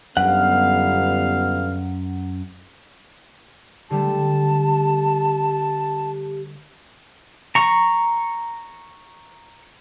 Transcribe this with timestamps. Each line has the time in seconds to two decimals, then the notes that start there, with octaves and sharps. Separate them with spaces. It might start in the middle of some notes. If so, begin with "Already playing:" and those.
0.17 G1 F#2 B3 F5 F#5
3.91 D3 G3 A3 G4 A5
7.55 A#5 C#6